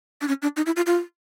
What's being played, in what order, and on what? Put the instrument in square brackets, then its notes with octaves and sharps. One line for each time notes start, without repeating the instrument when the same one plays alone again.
[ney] D4
C#4
D4
D#4
E4
F4
F4